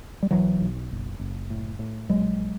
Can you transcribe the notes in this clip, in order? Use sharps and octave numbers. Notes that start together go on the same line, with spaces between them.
G3
B1 E3 F#3
B1
F#1
F#1
A2
A2
A#1 F#3 G#3